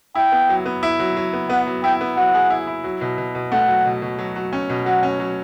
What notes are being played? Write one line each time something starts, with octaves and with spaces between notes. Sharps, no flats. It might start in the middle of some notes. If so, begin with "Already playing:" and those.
E4 G5
B3
F#3
B3
E4
F#3
F#3
B3
B3 F#5
F#3
E4 G5
B3
F#3 F#5
G#4
E4
E4
F#3
B2
B2
B2
A3 F#5
F#3
B2
B2
F#3
F#3
C#4
B2
F#3 F#5
C#4
F#3